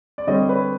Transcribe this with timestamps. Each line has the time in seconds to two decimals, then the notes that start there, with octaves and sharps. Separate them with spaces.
0.18 D5
0.27 D3 G3 C4 C#5 D#5
0.49 B4 C#5